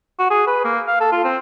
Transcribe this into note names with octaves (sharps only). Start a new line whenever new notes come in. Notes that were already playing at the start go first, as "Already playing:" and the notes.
F#4
G#4
B4
A#3
F5
A4
F4
C4